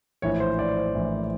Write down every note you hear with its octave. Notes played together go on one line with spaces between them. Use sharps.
A#1 A2 E3 C#5
C5
D5
C5
A#1 A2 E3